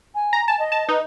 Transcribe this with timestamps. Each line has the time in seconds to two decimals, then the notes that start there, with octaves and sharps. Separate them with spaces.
0.15 G#5
0.33 A#5
0.48 G#5 A5
0.59 D#5
0.72 A5
0.89 D#4 B4